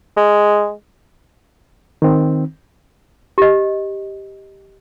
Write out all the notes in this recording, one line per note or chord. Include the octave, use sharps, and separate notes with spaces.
G#3
D#3 C4
G4 D#5